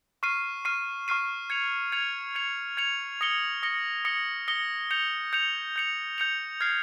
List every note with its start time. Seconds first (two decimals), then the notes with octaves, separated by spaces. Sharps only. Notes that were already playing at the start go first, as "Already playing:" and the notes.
0.23 C#6 F6 C7 D#7
0.65 C#6 F6 C7 D#7
1.08 C#6 F6 C7 D#7
1.50 G#6 C#7 F7
1.92 G#6 C#7 F7
2.35 G#6 C#7 F7
2.77 G#6 C#7 F7
3.21 D#6 A#6 C#7 G7
3.63 D#6 A#6 C#7 G7
4.05 D#6 A#6 C#7 G7
4.48 D#6 A#6 C#7 G7
4.91 G6 C#7 F7
5.33 G6 C#7 F7
5.76 G6 C#7 F7
6.18 G6 C#7 F7
6.60 F6 G#6 C7